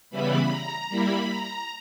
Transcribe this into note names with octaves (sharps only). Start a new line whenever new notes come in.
C#3 E3 G3 B3 E4 B5
A#5
G3 A#3 E4 B5
A#5